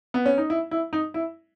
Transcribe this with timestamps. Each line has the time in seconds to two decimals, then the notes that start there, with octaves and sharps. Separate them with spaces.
0.14 B3
0.26 C#4
0.38 D#4
0.50 E4
0.71 E4
0.93 D#4
1.14 E4